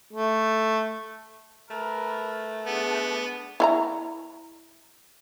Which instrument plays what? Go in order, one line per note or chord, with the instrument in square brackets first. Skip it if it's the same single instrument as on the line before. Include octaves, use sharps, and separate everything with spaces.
[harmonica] A3
[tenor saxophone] A3 [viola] A#4 B4
[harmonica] B3 [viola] D4 G#4
[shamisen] E4 F5 A#5